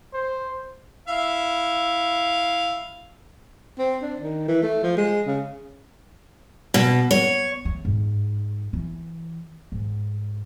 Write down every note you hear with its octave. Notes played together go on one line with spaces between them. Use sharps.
C5
E4 E5 F5
C4
D4
D#3
E3
A3
F3
G#3
C#3
B2
C#5
A3
G#2
E3
G#2